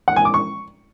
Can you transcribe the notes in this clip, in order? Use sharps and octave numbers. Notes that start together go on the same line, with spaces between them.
F#5
G#5
D6
C#6